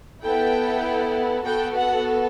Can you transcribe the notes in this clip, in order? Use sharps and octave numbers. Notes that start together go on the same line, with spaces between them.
B3 E4 A4 G5
B3 F#4 A4 G5
F#5